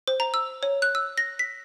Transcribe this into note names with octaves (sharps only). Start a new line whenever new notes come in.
C5
A#5
E6
C#5
F#6
E6
A#6
B6